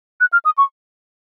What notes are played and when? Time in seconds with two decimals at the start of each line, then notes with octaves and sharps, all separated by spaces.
0.20 F#6
0.33 F6
0.45 D#6
0.58 C#6